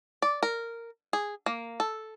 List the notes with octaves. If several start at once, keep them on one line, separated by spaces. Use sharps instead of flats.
D5
A#4
G#4
A#3
A4